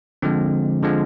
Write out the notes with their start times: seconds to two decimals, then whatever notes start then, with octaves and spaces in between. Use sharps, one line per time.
0.22 D3 F3 G#3 C4
0.82 D3 F3 G#3